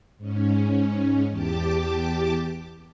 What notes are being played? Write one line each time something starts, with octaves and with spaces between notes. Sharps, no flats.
G#2 C#4
E2 G4 A5 D6